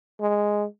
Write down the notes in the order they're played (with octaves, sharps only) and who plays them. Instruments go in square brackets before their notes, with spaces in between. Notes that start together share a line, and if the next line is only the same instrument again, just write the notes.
[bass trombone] G#3